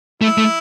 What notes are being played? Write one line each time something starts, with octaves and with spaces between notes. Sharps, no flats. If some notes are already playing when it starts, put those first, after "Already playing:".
A3 E4
A3